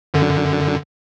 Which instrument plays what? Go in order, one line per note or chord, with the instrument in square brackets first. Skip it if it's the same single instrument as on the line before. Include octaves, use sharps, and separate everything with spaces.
[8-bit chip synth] F#2 D3